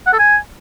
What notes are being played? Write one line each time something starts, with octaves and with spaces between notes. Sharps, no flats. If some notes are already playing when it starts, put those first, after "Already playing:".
F#5
A4
G#5